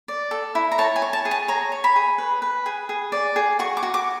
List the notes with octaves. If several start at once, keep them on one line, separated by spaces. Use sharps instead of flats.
D5
A4
E4
A#5
C#5 A5
G#5
C#5
A5
G#4
A5
C#5 A#5
C#5
B5
G#4
B4
B4
G#4
G#4
D5
G#4
F#4 C#6
D6
F#4
D6